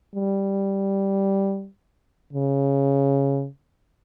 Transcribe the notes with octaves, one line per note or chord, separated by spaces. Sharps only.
G3
C#3